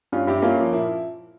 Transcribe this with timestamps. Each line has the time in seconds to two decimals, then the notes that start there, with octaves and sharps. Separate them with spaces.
0.12 G2 C#4 F4
0.27 G2 E4 G4
0.42 A#3 C#4 F4
0.58 F3
0.72 A#2 E4